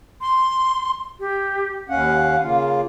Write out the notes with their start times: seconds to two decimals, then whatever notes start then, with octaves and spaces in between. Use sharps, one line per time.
0.21 C6
1.20 G4
1.89 D#2 C#4 F5 F#5
2.44 C#3 A#3 F4